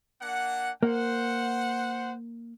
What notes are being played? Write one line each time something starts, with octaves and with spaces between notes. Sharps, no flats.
A#3 D4 F#5
A#3 C5 F#5